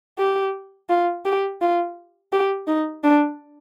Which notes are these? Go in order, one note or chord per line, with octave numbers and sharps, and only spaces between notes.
G4
F4
G4
F4
G4
D#4
D4